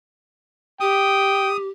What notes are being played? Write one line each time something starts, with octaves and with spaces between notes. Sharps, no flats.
G4 G5 D#6